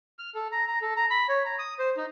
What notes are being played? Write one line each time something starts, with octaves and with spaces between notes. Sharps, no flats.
F6
A4
A#5
A#5
A4
A#5
B5
C#5
A#5
D#6
C5
D#4